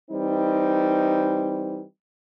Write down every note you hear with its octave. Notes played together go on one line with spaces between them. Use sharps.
E3 G3 C4 D#4